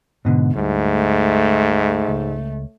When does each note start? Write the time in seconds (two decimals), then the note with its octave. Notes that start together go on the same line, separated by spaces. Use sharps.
0.25 G#2 B2 D3
0.56 D2 G#2 G3 A3
2.08 C#2